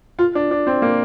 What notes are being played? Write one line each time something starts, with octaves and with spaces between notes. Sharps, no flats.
F4
D4
D4
C4
A#3